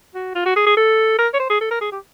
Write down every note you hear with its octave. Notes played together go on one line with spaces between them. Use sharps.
F#4
F4
F#4
G#4
G#4
A4
A#4
C#5
C5
G#4
A4
A#4
G#4
G4